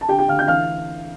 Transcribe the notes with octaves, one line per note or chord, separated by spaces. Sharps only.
A5
D3 G4 G5
G4 G5
D2 F5 F6
G5 G6
E3 F5 F6